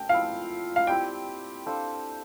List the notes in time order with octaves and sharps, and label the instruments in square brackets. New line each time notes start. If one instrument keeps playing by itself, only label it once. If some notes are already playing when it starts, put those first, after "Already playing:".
Already playing: [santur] D4 A4 [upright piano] G5
[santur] F3 C4 E4 [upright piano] F5
[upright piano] F5
[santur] C4 E4 G4 D5 [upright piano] G5
[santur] D4 A4 C5 F5